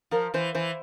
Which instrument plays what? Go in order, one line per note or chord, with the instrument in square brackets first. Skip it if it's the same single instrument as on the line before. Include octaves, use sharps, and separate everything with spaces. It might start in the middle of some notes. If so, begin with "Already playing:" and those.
[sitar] F3 [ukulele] A#4
[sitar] E3 [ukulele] C5
[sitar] E3 [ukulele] C5